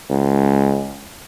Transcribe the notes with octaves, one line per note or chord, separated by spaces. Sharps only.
C#2